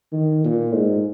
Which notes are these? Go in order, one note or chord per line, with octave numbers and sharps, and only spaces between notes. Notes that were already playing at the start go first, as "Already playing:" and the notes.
D#3
A#2
G#2